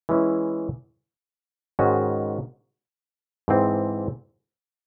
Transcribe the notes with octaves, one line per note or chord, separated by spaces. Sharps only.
E3 G#3 C#4 E4
G#2 D#3 G#3 C#4 F#4
G#2 E3 C4